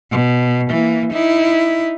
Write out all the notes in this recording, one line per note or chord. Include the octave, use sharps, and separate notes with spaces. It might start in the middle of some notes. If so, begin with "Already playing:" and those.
B2
E3 A#3
D#4 E4